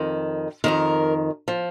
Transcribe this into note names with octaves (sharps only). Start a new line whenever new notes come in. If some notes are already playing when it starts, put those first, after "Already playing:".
Already playing: F2 D#3
F2 C3 D#3 A#4
F3